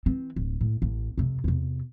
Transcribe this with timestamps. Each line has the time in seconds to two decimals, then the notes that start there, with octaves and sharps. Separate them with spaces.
0.06 E3 C4
0.36 D1
0.61 A2
0.82 A1
1.18 F2 C3
1.44 E2 C3